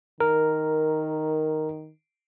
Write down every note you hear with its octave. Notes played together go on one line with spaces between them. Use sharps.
D#3 A#4